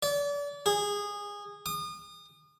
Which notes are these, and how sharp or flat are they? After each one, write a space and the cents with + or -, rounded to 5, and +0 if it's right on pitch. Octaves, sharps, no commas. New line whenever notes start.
D5 -35
G#4 -20
D#6 -35